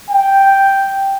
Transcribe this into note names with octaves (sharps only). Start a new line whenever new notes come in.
G5